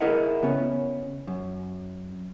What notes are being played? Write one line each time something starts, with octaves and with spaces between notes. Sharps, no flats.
E4 G#4 A#4 D#5 E5 F#5
C#3 B3 C#4
F#2